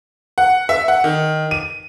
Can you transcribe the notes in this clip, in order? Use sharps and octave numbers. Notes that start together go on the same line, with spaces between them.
F#5
E5
F#5
D#3
D#7